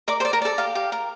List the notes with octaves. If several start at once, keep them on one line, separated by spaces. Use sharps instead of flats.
A#4 D5 D6
C5 C6
D5
A#4 A#5
A4 D5 A5
G4 F5
G4
A#4